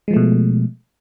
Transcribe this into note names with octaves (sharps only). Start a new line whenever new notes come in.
B2 F3 G#3 A3